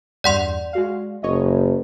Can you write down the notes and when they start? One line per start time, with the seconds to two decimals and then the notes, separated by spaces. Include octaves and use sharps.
0.24 E2 G2 D5 F#5 C6
0.73 G#3 F#4 F5
1.23 F#1 C#5 D#5